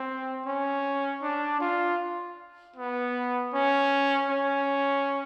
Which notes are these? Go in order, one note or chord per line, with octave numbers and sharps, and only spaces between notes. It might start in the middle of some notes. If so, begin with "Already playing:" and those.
Already playing: C4
C#4
D4
F4
B3
C#4
C#4